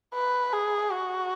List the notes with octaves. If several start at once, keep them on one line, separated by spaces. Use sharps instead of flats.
B4
G#4
F#4